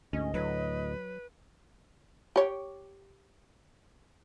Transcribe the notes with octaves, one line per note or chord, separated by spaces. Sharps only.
D2 G#2 C#4 D#5
D2 A2 F#3 B4
G4 C#5